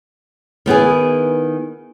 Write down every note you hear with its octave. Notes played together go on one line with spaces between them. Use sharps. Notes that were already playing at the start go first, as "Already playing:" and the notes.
D#3 B3 E4 G#4